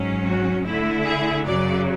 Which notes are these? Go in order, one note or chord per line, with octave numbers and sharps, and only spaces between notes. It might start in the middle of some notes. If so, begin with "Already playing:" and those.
Already playing: G#2 F#3 C#4
F#4
D3 A3 E4
G#4
F#2 C#3 F#3 D5